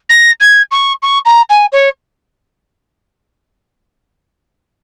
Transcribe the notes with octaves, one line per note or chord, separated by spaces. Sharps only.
A#6
G#6
C#6
C#6
A#5
G#5
C#5